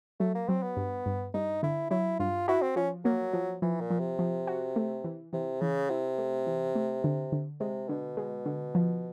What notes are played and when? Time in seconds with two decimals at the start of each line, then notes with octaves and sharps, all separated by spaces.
0.20 F#3 A3
0.35 A#3
0.49 F#3 C4
0.63 B3
0.77 G2
1.06 G2
1.34 G2 D#4
1.63 D3 E4
1.91 F#3 E4
2.19 G2 F4
2.48 E4 F#4
2.62 C4
2.76 F3 C#4
3.05 F#3 A#3
3.33 F3
3.62 E3 F3
3.81 A#2
3.90 F3
4.00 C3
4.19 F3
4.47 F#4
4.76 A3
5.04 E3
5.33 C3 E3
5.61 C#3 E3
5.89 C3 E4
6.18 A3
6.47 E3
6.75 A3
7.04 D3
7.32 D3
7.60 C3 G#3
7.89 B2 D3
8.17 B2 G#3
8.46 D3
8.75 F3